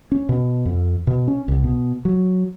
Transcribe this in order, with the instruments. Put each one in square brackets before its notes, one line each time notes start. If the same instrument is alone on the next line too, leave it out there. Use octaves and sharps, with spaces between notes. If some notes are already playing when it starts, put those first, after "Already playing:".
[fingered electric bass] C#4
B2
F2
B2
C#4
C2
B2
F#3